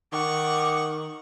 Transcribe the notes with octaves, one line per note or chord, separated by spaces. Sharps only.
D#3 F#5 C#6 D6